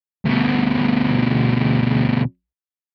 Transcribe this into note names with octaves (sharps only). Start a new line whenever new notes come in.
D2 B2